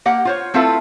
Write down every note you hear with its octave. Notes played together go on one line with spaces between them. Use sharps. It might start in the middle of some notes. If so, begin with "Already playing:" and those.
A#3 G4 F#5
F4 C5 C#5
A3 C4 E4 F4 A4 B4